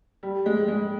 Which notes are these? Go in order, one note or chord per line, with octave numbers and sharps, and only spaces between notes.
G3
G#3
G#3